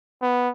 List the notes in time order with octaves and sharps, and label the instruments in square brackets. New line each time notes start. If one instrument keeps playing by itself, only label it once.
[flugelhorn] B3